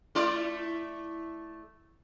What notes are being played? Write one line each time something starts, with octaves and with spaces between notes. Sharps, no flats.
A3 E4 D5